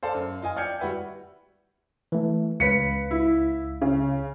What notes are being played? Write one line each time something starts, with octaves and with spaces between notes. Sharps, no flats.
A4 C5 D5 F5 A5
F#2
F4 D#5 G#5
D5 G5 F6 G6 G#6 C#7
G3 F#4 B4 E5
E3 A3
C#2 B4 F5 B6 C#7
E4
C#3